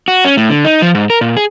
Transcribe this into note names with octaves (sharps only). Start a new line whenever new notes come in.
F#4
C#4
A2
D3
D#4
F3
G#2
A#4
A#2
G#4